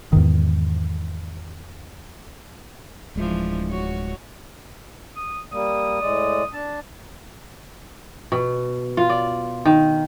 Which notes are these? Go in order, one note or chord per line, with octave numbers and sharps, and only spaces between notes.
E2 G#2 D#3
D1 E3 F3 G#3 D4
F#4 C#5
D#6
G3 A#3 D#6
A2 G#3 D5
D4 A5
B2
F4
D5
D#3